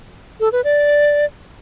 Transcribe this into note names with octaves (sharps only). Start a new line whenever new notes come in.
A4
B4
D5